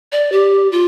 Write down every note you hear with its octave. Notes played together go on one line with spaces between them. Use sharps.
D5
G4
F4